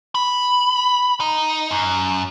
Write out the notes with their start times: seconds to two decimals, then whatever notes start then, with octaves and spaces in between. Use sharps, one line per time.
0.15 B5
1.20 D#4
1.71 F#2